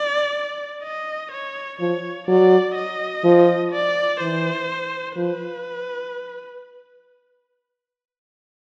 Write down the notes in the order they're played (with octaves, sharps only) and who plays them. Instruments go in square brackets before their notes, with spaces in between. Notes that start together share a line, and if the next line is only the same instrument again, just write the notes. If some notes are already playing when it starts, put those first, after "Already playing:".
Already playing: [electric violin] D5
D#5
C#5
[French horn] F3 [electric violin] C#5
[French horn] F#3 [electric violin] D5
[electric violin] D#5
[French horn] F3
[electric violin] D5
[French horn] E3 [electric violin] C5
[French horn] F3 [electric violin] B4